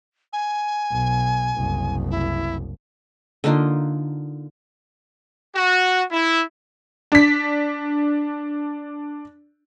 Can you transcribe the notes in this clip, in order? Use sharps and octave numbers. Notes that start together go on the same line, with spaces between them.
G#5
B1
F#1 C2
E4
D3 A#3 D#4 F4
F#4
E4
D4 B6